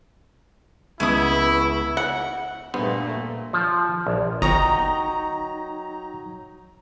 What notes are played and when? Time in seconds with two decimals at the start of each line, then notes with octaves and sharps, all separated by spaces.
1.00 C#2 B3 C#4 E4 E5 A5 D#6
1.97 F#5
2.74 G2 A#2 A3 B3 C5
3.53 F3
4.07 A#1
4.42 G1 F#3 D#4 G5 A#5 C#6 D#6